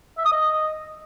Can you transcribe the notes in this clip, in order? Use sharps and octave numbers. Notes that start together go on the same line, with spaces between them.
E5
D#6
D#5